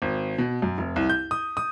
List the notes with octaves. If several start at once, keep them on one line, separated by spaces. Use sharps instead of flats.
G#1
B2
F#2
F1
C2
G6
D#6
D#6